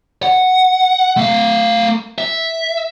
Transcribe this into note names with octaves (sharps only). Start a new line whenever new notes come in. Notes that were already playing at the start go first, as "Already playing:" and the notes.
F#5
A3 F5
E5